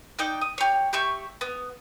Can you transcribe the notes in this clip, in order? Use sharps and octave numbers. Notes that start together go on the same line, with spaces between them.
D#4 D5 G5 F#6
D#6
G4 C#5
G4 E5 C#6 G6
B3